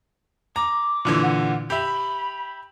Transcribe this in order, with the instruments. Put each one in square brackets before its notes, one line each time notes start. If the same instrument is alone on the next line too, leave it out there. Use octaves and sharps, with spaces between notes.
[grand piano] A#5 [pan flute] D6
[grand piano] A#2 D3 E3
[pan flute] F#5
[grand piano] G4 E5 [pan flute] B5